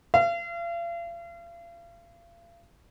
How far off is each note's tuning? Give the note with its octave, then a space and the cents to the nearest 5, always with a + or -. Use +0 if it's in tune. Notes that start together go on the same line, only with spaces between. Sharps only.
F5 -40